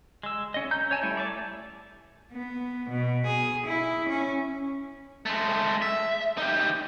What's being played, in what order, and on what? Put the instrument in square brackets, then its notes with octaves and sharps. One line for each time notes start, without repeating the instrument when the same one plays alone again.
[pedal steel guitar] G#3 E6
C#4 D#5
A#5 G6
C#5 G#5 A5
G3 A3 E4
D5 E5 A5
[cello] B3
B2
G#4
E4
C#4
[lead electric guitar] G#3 A3
E5
D#4 G4